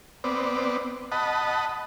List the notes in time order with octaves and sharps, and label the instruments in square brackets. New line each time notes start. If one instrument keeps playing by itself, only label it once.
[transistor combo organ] B3 C4 D5
D#5 F#5 A5 B5